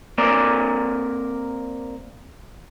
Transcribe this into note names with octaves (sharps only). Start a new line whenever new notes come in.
A#3 C4 A#4 D5